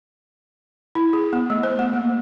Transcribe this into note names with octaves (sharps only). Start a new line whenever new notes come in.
E4
G#4
B3
A3
C5
B3
A#3